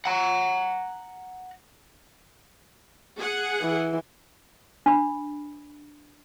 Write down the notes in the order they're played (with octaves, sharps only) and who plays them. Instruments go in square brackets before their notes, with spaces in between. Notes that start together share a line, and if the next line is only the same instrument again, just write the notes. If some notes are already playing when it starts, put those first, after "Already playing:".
[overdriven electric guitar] F#5 A#5
[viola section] G#4 F#5
[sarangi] E3
[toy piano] D4 B5